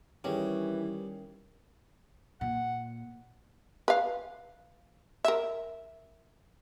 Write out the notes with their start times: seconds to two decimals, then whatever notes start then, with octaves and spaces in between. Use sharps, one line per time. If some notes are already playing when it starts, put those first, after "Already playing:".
0.24 D#3 E3 G3 C#4 G#4 C#5
2.41 A#2 F#5
3.88 B4 F5
5.24 A#4 E5